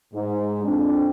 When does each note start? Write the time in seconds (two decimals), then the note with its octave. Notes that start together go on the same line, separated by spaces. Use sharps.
0.13 G#2
0.64 F2 C4 D4